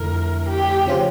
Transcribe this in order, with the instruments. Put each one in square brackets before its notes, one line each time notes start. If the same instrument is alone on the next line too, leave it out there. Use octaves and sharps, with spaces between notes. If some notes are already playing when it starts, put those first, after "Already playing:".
Already playing: [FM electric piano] F2 D3 F3 A3 E4 [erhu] A#4
[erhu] G4
[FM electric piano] C#3 F3 C#4 F4